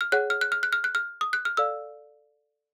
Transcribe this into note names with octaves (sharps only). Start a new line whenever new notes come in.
F6
G#4 C#5 F#5 F#6
F6
F#6
F6
F#6
F6
F#6
F6
D#6
F#6
F6
A4 D5 F5 E6